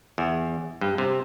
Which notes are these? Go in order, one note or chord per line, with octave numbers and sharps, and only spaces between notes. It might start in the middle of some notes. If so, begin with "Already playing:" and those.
E2
G2
C3